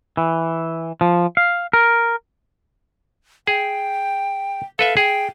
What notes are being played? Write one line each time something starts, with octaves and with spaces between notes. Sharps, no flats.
E3
F3
F5
A#4
G#4 G5
A4 B4 E5 F5
G#4 G5